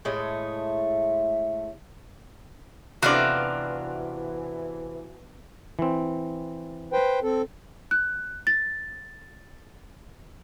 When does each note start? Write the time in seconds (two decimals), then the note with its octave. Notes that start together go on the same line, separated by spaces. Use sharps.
0.05 A2 G#3 A3 D#5
3.03 C3 E3 B3 D4 F4 F#4 D5 F5
5.79 E3 C4
6.93 B4 C5 G5
7.23 C4 A4
7.91 F#6
8.47 A6